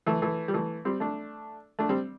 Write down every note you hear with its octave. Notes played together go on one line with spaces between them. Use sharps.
E3 A3
E3 A3
G3
E3 A3
G3 C4
A3 D4
A3 D4
G3 C4